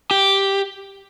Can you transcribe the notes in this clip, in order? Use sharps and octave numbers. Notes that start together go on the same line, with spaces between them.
G4